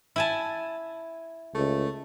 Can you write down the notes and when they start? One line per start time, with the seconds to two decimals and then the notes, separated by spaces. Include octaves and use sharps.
0.16 E4 G#5 A5
1.55 C#2 A3